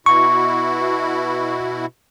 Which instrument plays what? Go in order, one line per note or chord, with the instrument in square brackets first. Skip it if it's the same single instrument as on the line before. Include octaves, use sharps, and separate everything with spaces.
[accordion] B2 E4 F#4 [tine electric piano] C#6